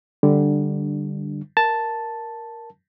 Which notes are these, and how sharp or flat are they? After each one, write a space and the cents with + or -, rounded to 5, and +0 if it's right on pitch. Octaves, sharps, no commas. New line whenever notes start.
D3 +0 G3 +0 D4 +15
A#4 +0 A5 +0